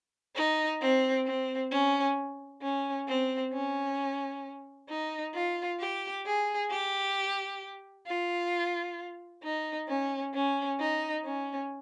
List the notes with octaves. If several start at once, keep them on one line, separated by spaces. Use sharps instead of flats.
D#4
C4
C4
C#4
C#4
C4
C#4
D#4
F4
G4
G#4
G4
F4
D#4
C#4
C#4
D#4
C#4